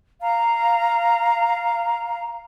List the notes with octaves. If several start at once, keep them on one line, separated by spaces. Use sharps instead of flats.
F5 A#5